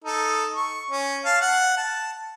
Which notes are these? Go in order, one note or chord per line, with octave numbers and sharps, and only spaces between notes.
D#4 A4
C#6
C#4
F5 A5
F#5
A5